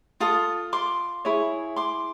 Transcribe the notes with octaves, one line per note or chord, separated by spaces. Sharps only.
F4 A4 D#6
C6 D6
E4 G#4 C#5
C6 D6